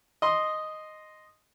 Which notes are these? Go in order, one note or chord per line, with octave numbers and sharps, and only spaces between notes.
D#5 C6 D#6